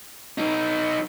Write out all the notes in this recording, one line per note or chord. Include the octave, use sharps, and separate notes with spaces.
F#3 D#4